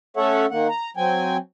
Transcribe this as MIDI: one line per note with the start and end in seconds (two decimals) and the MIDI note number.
0.17 0.46 57
0.17 0.46 61
0.17 0.46 69
0.17 0.46 73
0.17 0.46 76
0.17 0.46 78
0.51 0.67 51
0.51 0.67 58
0.51 0.67 78
0.68 0.90 82
0.97 1.37 54
0.97 1.37 60
0.97 1.37 79
0.97 1.37 80